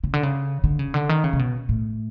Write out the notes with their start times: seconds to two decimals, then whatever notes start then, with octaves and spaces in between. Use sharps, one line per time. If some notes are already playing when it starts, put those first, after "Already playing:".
0.04 C#3
0.13 D3
0.23 C#3
0.64 D3
0.79 C#3
0.94 D3
1.09 D#3
1.24 C#3
1.33 C3
1.39 B2
1.69 A2